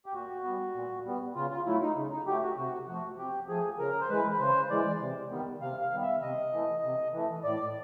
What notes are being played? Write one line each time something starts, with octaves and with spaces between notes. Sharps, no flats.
G4
A#2 F#4
G3 B3
A#2
G3 B3
C#3 F4
F4
F#3 A3 E4
D#4
C#3
D#4
F#3 A3 G4
F#4
C3 F#4
F3 A3 F#4
C3 G4
F3 A3 G#4
C#3 A#4
C5
E3 G#3 B4
B4
C#3 C5
E3 G#3 D5
C3
D#3 G3 B3
C3 F5
F5
D#3 G3 B3
E5
C3 D#5
E3 A3
C3
E3 A3
A2 D5